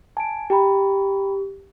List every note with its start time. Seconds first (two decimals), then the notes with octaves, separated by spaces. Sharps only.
0.17 G#5 A5 D7
0.50 G4 G5 A#5 B5